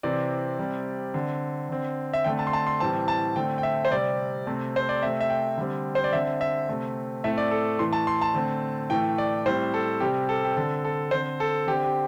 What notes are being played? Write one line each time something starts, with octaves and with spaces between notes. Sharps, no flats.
C3 E3 C4 D5
C3 G3 C4
D3 C4
D3 C4
E5
D3 A3 C4 G5
A5
C6
A5
C6
A2 E3 G3 C4 A5
A5
D3 A3 C4 G5
G5
E5
C5
C3 G3 C4 D5
C3 A3 C4
C5
D5
C3 A3 C4 E5
E5
G5
D3 G3 C4
C5
D5
D3 C4 E5
E5
C3 A3 C4
A2 A3 C4 E5
D5
A4
A2 E3 A3 C6
A5
C6
A5
D3 A3 C4
A2 E3 A3 G5
D5
A2 G3 C4 C5
A4
C3 G3 C4 G4
A4
G4
D3 C4 A4
A4
D3 C4 C5
A4
D3 C4 G4
G4